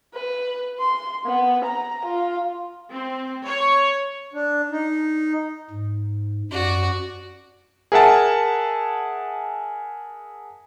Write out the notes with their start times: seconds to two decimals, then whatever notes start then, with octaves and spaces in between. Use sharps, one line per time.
0.14 B4
0.80 C6
1.26 B3
1.65 A#5
2.05 F4
2.94 C4
3.46 C#5
4.34 D4
4.72 D#4
5.71 G#2
6.51 F#2 F#4 D5
7.92 G#4 A#4 E5 F#5 A5